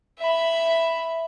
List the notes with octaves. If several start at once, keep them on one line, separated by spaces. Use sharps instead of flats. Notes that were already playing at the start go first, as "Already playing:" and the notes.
E5 B5